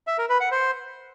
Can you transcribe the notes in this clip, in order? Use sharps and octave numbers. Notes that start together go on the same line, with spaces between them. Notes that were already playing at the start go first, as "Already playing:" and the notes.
E5
A#4
B4
F#5
C5